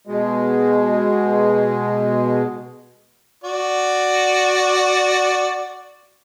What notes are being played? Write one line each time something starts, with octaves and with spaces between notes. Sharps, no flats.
B2 G#3
F#4 D5